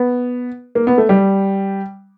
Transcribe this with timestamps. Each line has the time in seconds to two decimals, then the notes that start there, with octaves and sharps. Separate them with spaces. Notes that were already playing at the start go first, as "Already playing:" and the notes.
Already playing: B3
0.75 A#3
0.87 B3
0.98 A3
1.09 G3